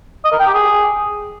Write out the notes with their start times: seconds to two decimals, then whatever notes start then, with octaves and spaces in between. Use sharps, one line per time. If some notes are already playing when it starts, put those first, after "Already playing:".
0.25 D#5
0.32 A#4
0.39 G5
0.46 G4
0.54 G#4